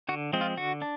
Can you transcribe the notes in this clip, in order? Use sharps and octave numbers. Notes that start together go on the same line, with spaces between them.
D3 F#4
F3 G#3 C4
F4
D3 F#4
D4